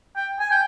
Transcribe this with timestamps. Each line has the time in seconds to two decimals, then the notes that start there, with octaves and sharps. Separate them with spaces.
0.16 G5
0.40 G#5
0.51 G5